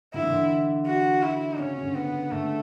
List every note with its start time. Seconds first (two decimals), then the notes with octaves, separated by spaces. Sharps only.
0.14 D3 E4
0.23 E3
0.30 D3
0.87 F#4
1.23 E4
1.59 C#3 C#4
1.77 C#3
1.84 D3
1.95 B3
2.08 C#3
2.32 D3 A3